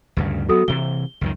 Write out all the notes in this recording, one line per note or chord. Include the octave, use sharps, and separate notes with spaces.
D2 G2 C#3
G2 F#3 B3 F#4 A4 D#6
C3 E3 G7
C#2 F#2 D#3